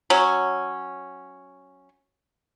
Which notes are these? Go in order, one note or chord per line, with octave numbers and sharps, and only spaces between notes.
F#3 C#4